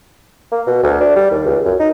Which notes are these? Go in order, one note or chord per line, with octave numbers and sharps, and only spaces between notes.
A#3
B2
D2
D4
G3
D#2
C#2
F#2
D#4